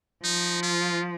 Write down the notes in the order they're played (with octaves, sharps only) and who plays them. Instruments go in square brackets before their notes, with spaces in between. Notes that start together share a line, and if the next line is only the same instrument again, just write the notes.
[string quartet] F3 [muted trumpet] D#4
[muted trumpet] F4